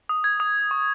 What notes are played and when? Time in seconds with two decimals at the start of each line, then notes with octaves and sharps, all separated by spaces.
0.09 D#6
0.24 G#6
0.40 D#6
0.71 C#6